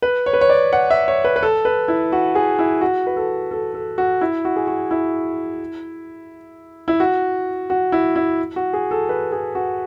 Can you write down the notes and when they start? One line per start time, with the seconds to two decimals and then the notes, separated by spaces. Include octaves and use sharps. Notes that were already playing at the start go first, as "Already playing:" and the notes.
0.02 B4
0.26 C#5
0.33 B4
0.41 C#5
0.50 D5
0.73 F#5
0.90 E5
1.08 C#5
1.24 B4
1.36 B4
1.43 A4
1.65 B4
1.88 E4
2.12 F#4
2.35 G#4
2.59 E4
2.81 F#4
3.07 B4
3.16 A4
3.51 A4
3.74 A4
3.98 F#4
4.21 E4
4.45 F#4
4.56 G#4
4.67 F#4
4.91 E4
6.88 E4
7.00 F#4
7.70 F#4
7.92 E4
8.16 E4
8.56 F#4
8.73 G#4
8.91 A4
9.09 B4
9.32 G#4
9.55 F#4